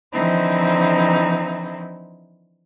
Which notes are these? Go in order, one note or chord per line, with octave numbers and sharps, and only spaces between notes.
D3 E3 F3 C4 D#4 E4